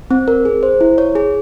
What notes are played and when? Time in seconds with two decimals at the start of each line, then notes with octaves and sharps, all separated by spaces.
0.11 C4
0.28 A#4
0.45 G#4
0.63 C5
0.81 E4
0.98 C#5
1.15 G#4